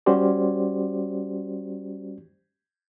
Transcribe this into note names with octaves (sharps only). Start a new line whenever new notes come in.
G3 C#4 F#4 G4 C5 D5